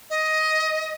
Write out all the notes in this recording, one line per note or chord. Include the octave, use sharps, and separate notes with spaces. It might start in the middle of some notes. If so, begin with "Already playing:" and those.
D#5